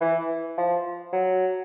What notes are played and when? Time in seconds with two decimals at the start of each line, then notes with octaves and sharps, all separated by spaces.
0.01 E3
0.58 F3
1.13 F#3